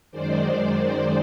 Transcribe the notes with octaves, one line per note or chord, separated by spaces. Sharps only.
F#2 D#3 G#3 C5 D5